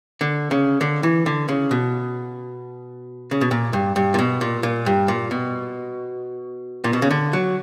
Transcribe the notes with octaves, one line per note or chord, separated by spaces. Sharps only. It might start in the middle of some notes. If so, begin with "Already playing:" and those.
D3
C#3
D3
E3
D3
C#3
B2
C#3
B2
A#2
G2
G2
A#2
B2
A#2
A#2
G2
A#2
B2
A#2
B2
C#3
D3
F#3